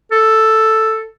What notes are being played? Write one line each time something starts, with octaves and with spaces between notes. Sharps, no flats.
A4